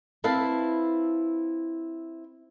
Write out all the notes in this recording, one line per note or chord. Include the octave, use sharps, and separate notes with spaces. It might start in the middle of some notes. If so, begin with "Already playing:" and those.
C4 E4 B4 F5 F#5 A5